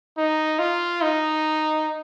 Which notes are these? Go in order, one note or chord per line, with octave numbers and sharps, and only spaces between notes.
D#4
F4
D#4